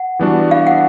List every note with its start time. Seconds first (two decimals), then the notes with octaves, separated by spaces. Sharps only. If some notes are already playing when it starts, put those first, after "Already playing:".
Already playing: F#5
0.19 E3 G3 B3 D4 F#4
0.51 F5
0.67 F#5